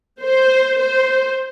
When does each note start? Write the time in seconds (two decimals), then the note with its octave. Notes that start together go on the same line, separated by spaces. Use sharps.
0.21 C5
0.78 C5